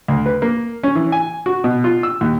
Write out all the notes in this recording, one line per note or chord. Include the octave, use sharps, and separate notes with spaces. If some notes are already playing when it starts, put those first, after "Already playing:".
D2
B4
A#3
C#4
E3
G#5
F#4
B2
F4
E6
D#2